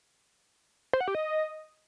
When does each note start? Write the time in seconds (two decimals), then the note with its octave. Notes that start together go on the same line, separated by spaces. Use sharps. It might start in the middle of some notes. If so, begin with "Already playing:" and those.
0.93 C5
1.00 F#5
1.08 G4
1.15 D#5